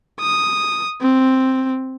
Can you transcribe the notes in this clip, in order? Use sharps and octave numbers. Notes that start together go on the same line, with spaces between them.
D#6
C4